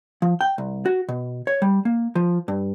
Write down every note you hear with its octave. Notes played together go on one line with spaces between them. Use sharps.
F3
G5
C2
F#4
B2
C#5
G3
A#3
F3
G2